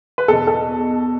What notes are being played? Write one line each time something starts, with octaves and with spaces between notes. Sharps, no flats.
B4
E2 B2 A4
A4